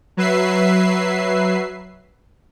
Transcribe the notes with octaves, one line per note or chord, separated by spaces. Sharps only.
F#3 B4 E5 C7